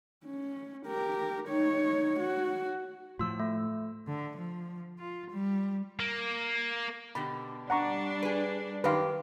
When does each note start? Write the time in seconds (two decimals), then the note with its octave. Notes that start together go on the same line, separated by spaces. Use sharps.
0.25 C#4
0.86 G4 A#4
1.48 D#4 C#5
2.20 F#4
3.19 A2 F3 F4 E6
3.40 A3
4.08 D3
4.37 F3
4.99 F4
5.31 G3
6.00 A#3
7.15 B2 D3 G4 B5
7.70 G3 D4 F#5 A#5 C#6
8.23 G#4 B4
8.84 F#2 D#3 G4 B4 F5 C6